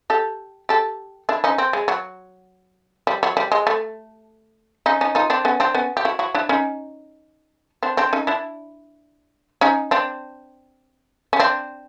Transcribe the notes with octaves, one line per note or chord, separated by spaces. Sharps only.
G4 A4
G4 A4
D4 E4
C#4 D#4
C4
G#3
F#3
G3
F#3
G3
G#3
A3
C#4 D#4
C#4 D#4
D#4 F4
C4 D4
B3 C#4
C4 D4
B3 C#4
G4
E4 F#4
E4 F#4
D4 E4
C#4 D#4
C4 D4
C4 D4
C#4 D#4
D4 E4
C#4 D#4
C4 D4
C#4
C4 D4